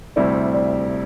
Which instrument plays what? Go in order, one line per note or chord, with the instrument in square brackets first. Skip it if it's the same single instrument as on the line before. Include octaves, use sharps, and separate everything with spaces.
[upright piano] D2 C3 G3 C4 E4 [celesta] D5
[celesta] D5